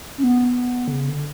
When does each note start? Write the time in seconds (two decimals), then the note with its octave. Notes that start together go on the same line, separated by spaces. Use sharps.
0.18 C#4
0.24 B3
0.88 D3
0.92 C#3
1.09 D3